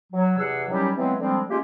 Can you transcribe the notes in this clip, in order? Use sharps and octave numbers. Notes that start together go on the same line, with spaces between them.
F#3
E2 C3 G#4 F#5 E6
D#3 F#3 G3 C#4 E4 G4
E3 F#3 G#3 B3 C4
D3 F3 G3 G#3 A#3 C4
G#3 A#3 C#4 F4 G4